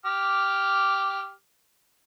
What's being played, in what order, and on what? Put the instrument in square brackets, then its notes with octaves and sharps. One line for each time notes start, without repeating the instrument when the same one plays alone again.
[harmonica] G4 D6 F6